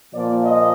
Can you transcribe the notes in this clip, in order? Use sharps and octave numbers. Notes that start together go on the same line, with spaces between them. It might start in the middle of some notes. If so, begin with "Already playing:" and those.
A#2 F3 A#3 D5
D#5